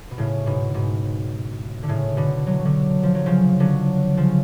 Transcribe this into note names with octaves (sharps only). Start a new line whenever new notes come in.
B2
A2 C#3
G#2 B2
G#2 B2
D3
A2 C#3
B2 D3
F#3
D3 F#3
F3
F#3
C#3 F3
D3 F#3
C#3 F3